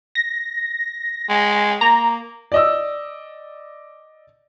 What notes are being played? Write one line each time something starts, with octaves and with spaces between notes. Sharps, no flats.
A#6
G#3
A#3 A#5
D5 D#5 E6